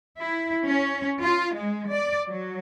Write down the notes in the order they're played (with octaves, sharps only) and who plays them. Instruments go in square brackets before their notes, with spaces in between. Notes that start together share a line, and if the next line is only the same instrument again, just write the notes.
[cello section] E4
C#4
F4
G#3
D5
F#3